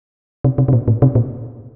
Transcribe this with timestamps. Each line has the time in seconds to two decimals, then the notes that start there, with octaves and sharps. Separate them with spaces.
0.45 C3
0.58 C3
0.68 C3
0.73 A#2
0.88 A2
1.02 C3
1.15 A#2